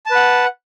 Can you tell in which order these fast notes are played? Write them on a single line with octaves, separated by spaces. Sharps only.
A5 B4 F#5